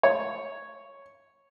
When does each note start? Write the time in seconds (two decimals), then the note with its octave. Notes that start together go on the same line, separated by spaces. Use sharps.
0.03 C#5